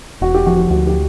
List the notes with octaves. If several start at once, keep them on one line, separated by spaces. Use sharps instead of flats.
E1 F#4
G4
F3 F#4
G4
D2 F#4
G4